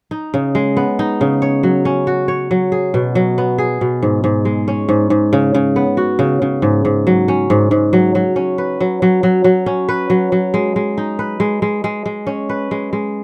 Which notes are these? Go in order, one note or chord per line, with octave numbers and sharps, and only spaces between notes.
D#4
C#3
G#3
B3
D#4
C#3
C#5
F#3
C#4
F#4
C#5
F#3
G#4
B2
F#3
B3
G#4
B2
G#2
G#2
G#3
C#4
G#2
G#2
C#3
C#3
B3
F#4
C#3
C#3
G#2
G#2
F#3
C#4
G#2
G#2
F#3
F#3
C#4
B4
F#3
F#3
F#3
F#3
C#4
B4
F#3
F#3
G#3
G#3
D#4
B4
G#3
G#3
G#3
G#3
C#4
B4
G#3
G#3